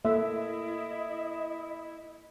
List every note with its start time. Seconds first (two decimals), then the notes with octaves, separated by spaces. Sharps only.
0.05 A#3 E4 A4 D#5 E5